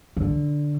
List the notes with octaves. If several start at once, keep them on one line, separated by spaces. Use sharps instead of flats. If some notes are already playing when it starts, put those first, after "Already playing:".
D3